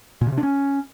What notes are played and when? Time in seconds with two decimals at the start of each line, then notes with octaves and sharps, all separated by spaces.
0.21 A#2
0.27 C#3
0.32 C3
0.38 D4
0.43 C#4